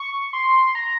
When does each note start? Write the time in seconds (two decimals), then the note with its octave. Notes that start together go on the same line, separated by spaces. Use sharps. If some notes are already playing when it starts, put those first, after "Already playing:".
Already playing: C#6
0.33 C6
0.75 A#5